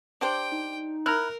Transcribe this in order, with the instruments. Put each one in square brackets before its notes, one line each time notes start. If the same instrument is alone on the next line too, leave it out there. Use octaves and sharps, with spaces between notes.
[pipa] D4 G4 C5 [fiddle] G5 [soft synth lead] D7
[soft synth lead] D#4
[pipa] E4 [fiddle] A#4 [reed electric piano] A#5 F6 F#6